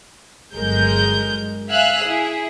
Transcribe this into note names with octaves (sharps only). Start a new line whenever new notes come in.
G1 F#3 G#3 A#4 G6
E5 F5 G#5 E6 F#6
E4 G#4